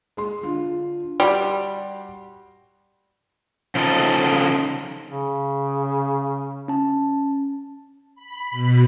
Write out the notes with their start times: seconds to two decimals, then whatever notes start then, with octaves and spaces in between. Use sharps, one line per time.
0.17 G#3 C6
0.43 D3 F4
1.20 G3 F#4 G4 C6
3.75 C#3 F3 D#4 A4
5.09 C#3
6.68 C#4 A5
8.15 B5
8.51 B2